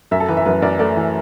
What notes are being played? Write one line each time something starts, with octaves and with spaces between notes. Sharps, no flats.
F#2 E5
A4
E3 B4
E5
F#2 B4
F#2 D5
A3 D5
E3